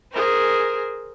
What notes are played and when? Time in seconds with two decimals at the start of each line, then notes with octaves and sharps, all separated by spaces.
0.12 G#4 A#4 C5